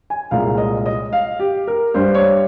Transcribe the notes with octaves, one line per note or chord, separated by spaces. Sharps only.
G#5
C2 A#2 G#3 F5
D#5
D#5
F5
G4
A#4
G2 G3 C5
C#5